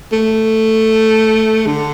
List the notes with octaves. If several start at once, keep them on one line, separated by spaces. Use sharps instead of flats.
A3
D3